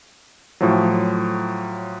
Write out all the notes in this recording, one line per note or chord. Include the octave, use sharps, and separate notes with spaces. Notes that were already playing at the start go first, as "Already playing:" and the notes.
A2 F3 F#3